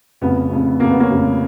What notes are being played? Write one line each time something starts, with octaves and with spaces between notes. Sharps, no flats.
F1 F2 C#3 B3
F1 F2 C#3
F1 F2 C#3 A#3
B3
A#3 C#4
F1 F2 C#3